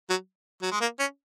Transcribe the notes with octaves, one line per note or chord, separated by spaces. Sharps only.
F#3
F#3
G#3
A#3
C#4